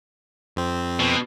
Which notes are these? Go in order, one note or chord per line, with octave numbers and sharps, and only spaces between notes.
F2 C4
B2